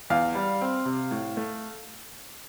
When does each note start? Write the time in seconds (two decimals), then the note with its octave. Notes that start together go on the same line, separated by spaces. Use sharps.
0.10 E2 F5
0.35 G3
0.61 C4
0.85 C3
1.11 A2
1.37 A3